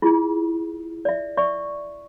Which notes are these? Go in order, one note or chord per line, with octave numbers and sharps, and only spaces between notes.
E4 F4 G#4
D5 E5
D5 E5 C#6